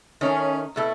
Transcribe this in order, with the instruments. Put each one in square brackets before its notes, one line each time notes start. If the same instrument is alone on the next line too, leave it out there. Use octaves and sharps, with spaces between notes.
[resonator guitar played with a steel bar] D#3 A3 D#4 [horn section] C#4
[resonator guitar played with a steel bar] B2 A3 E4